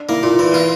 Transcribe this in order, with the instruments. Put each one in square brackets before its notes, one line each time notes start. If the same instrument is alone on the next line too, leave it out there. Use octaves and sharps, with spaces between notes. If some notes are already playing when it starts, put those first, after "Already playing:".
Already playing: [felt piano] D4
[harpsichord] A#3 [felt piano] E4
[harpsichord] A#2 [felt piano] F4
[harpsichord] E3 [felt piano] E4
[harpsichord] F4